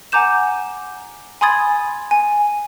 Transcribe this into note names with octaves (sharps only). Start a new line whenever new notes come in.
F#5 G#5 A#5 D6 G6 E7
G#5 B5 C6 D#6 G#6 A6
G#5